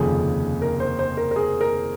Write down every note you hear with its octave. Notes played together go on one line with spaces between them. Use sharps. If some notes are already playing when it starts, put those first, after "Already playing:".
Already playing: F1 D#2 C#3 F3 G#4
A#4
C5
C5
A#4
A#4
G#4
A#4